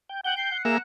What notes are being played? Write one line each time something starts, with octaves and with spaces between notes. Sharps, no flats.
G5
F#5 G5 G6
G5 C7
F#5
A#3 G#4 A#4 E5 E7